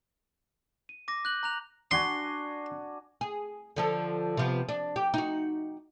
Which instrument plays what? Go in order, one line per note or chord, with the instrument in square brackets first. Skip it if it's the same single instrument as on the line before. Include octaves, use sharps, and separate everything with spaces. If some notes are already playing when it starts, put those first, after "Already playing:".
[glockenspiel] D#7
D6 A#6
F#6 G6 F#7
A#5 F#6 F7
[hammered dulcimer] D4 F#4 G#5 [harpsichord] C6
[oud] G#4
D3 F3 A4
C3 F3 B3
D4
G4
D#4 F#4